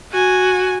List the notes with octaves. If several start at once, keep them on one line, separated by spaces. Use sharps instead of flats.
F#4 G#5